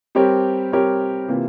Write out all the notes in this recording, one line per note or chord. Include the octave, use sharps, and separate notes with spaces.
G3 C4 G4 A#4 C#5
G3 C4 G4 A#4 C#5
C3 E3 A#3 F4